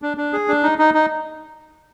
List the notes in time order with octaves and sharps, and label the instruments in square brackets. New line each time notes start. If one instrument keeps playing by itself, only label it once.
[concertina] D4
D4
G#4
D4
D#4
D#4
D#4